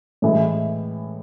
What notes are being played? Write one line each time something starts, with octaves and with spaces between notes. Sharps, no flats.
A2 E3 G#3